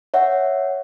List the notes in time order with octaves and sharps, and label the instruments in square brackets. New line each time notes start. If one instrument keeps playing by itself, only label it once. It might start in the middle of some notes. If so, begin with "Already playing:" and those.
[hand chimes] C#5 E5 F#5